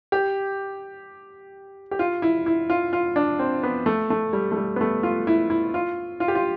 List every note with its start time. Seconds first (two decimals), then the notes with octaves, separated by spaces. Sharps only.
0.12 G4
1.91 G4
1.99 F4
2.22 E4
2.46 E4
2.70 F4
2.93 F4
3.16 D4
3.39 C4
3.63 B3
3.86 A3
4.10 A3
4.33 G3
4.52 A3
4.57 G3
4.76 B3
4.81 A3
5.03 F4
5.27 E4
5.50 E4
5.74 F4
6.20 F4
6.28 G4
6.35 F4